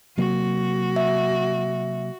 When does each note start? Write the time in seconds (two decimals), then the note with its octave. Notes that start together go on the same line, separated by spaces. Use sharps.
0.18 C3 F#3 A#3 F#4
0.96 E5